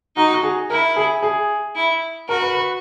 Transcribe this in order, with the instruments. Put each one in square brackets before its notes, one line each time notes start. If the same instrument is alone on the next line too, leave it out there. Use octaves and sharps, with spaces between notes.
[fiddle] D#4 [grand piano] F#4
[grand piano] F#4
G#4
[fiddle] E4 [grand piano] A#4
[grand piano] G#4
G#4
[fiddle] E4
[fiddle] F#4 [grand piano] A#4
[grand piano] B4
B4